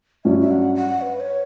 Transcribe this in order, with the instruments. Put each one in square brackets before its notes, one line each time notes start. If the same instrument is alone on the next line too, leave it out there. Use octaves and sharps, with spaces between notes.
[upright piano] G2 F#3 C#4 [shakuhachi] E5
[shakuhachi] E5
F#5
F#5
B4
C#5